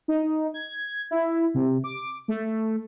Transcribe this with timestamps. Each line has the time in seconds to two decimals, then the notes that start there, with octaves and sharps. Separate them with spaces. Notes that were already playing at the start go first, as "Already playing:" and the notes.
0.08 D#4
0.54 G#6
1.11 E4
1.54 C3
1.84 D6
2.28 A3